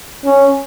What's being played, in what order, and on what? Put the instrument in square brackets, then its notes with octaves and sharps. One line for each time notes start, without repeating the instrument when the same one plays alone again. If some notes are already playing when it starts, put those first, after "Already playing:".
[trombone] C#4